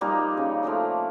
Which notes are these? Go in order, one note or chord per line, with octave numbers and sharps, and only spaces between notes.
F3 G3 A#3 D#4
C#3
F3 A3 A#3 D4